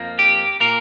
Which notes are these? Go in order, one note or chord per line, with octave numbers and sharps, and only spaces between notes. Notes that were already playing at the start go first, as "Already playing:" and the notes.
Already playing: F2 F3 A#3
G4
A#2 A#3 A#4